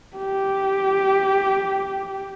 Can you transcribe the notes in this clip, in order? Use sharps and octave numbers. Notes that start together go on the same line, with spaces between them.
G4